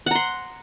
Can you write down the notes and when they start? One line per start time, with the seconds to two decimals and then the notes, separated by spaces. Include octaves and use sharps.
0.06 F#5
0.11 A#5
0.15 C6